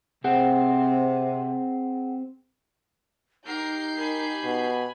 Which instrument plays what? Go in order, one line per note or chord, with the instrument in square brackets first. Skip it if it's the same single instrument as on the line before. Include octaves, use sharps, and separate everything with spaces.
[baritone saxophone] C3 [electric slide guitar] C4 [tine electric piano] G#4 F#5 G5
[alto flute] D#4 [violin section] G4 G6 C7 [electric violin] A#4
[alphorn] A#4 [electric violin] G#5 B5
[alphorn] B2